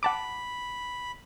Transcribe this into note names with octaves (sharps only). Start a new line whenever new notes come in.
F#5 A5 B5 D6